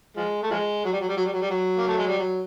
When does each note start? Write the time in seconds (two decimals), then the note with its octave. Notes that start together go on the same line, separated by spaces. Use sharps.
0.17 F3 G#3
0.43 A3
0.51 F3 G#3
0.85 F#3
0.93 G3
1.01 F#3
1.09 G3
1.17 F#3
1.25 G3
1.33 F#3
1.41 G3
1.50 F#3
1.78 A#3
1.87 A3
1.98 G#3
2.08 G3
2.18 F#3